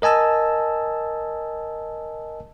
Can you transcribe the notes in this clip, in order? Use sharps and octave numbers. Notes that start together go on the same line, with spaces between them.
A#4 D#5 G#5 A5 E6